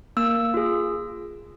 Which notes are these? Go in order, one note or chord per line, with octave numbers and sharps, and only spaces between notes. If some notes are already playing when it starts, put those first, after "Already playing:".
A#3 E6
F4 G#4